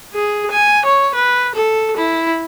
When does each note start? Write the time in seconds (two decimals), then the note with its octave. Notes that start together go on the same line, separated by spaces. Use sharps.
0.14 G#4
0.51 G#5
0.85 C#5
1.15 B4
1.56 A4
1.97 E4